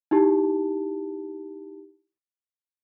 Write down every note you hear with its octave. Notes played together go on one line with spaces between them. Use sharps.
D#4 E4 G4 A5